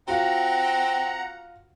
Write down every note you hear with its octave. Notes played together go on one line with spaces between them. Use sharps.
C4 F4 F#4 F#5 A#5